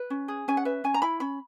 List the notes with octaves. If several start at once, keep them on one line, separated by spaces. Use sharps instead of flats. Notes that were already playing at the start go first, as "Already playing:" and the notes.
Already playing: B4
C#4
G#4
C#4 G#5
F#5
B4 E5
C#4 G#5
A#5
E4 B5
C#4 B5